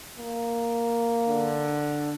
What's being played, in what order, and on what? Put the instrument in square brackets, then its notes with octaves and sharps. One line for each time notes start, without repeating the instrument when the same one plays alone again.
[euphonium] A#3
[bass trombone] D3